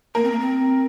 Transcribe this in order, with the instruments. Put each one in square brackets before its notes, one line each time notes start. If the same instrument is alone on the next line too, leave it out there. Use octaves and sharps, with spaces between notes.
[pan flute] A#3 [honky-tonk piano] A#4
[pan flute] C4
A#3
C4